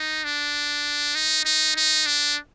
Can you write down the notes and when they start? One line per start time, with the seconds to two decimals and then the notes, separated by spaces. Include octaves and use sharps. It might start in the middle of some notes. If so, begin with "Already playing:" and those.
Already playing: D#4
0.24 D4
1.15 D#4
1.45 D#4
1.76 D#4
2.06 D4